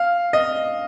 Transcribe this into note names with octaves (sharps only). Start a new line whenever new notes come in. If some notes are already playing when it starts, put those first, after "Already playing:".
Already playing: F5
D#5